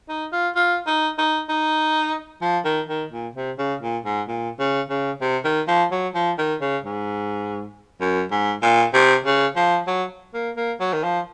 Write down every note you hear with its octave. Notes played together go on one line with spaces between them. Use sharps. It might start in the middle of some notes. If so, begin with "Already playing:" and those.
D#4
F4
F4
D#4
D#4
D#4
F3
D#3
D#3
A#2
C3
C#3
A#2
G#2
A#2
C#3
C#3
C3
D#3
F3
F#3
F3
D#3
C#3
G#2
F#2
G#2
A#2
C3
C#3
F3
F#3
A#3
A#3
F#3
D#3
F3